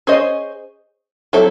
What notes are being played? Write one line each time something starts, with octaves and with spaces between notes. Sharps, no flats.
C#4 G#4 C5 D#5
F#3 C4 E4 A4